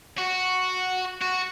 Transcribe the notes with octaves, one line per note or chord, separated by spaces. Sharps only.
F#4
F#4